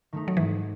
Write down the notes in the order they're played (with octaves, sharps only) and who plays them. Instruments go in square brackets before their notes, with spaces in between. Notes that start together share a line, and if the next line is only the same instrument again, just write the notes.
[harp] D#3 A3 D#4
[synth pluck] F#3
[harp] G#2 [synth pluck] E3